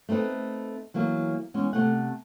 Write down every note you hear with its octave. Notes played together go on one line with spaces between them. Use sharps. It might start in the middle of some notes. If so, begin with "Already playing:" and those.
A3 C4 D#4 B4
E3 F#3 A#3
E2 G#3 C#4
C3 E3 A3 F#5